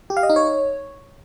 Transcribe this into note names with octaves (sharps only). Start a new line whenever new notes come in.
G4
F5
D#5
D#4
C#5